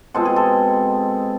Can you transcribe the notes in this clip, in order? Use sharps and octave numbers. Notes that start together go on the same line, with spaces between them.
B2 G#3 C4 A4
G#4
A4